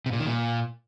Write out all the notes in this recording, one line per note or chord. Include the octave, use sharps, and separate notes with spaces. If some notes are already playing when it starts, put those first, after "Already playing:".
C3
A#2
D#3
A#2